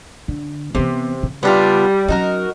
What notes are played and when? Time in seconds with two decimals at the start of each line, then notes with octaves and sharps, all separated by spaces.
0.28 D3
0.75 C3 E3 B3
1.23 C#3
1.43 G3 B3 D4 F4
2.08 F#3 C#4 D#4 F#4 A#4